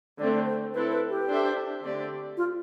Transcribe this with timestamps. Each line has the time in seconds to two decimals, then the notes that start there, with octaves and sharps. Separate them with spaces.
0.19 D3 A3 C4 D5
0.46 C5
0.74 C4 E4 A4 B4
0.92 B4
1.10 G4
1.27 D4 A4 C5 E5
1.82 D3 A3 C4 G4 D5
2.37 F4